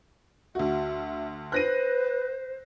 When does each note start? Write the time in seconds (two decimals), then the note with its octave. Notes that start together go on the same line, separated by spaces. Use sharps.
0.55 D2 F#4 E5
1.52 B4 C5 F#6 A#6 D#7